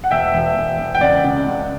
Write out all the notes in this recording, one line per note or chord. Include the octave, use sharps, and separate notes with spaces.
F#5
E1 E5 G5
E1
E1
E1
G5
C#2 D5 F#5
C#3
C#2